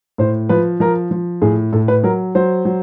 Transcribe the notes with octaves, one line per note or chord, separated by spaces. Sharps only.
A2 C5
F3 B4
F3 A#4
F3
A2 G#4
A2 A4
B4
F#3 A#4
F#3 C5
F#3